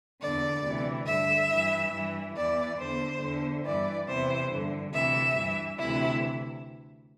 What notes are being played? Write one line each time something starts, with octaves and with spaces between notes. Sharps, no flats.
E2 D3 D5
D2 C3 E3
G2 D3 E5
G2 E3
G2 E3
E2 E3 D5
E2 D3 C5
E2 D3
G2 E3 D5
E2 C3 E3 C5
G2 D3
D2 C3 E3 E5
G2 E3
D2 C3 E3 E4